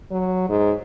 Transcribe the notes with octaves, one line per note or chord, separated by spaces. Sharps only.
F#3
G#2